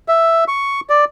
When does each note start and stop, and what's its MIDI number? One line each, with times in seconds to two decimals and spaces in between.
0.08 0.44 76
0.48 0.80 85
0.90 1.05 74